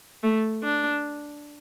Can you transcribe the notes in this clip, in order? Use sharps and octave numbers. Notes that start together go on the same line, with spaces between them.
A3
D4